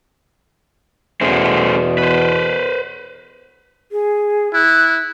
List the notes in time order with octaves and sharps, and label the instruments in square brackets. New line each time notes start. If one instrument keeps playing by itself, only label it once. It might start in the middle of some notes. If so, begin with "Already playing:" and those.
[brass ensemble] E2 B2 [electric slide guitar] A3 C#4 C5
[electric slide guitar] B4 C5
[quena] G#4
[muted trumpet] E4 [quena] F#6